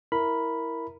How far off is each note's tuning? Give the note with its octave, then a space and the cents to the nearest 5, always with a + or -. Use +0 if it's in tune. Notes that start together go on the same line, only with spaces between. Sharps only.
E4 +0 A#4 +0 B5 +0